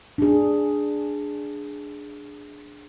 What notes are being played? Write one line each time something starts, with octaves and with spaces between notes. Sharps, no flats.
D4 G#4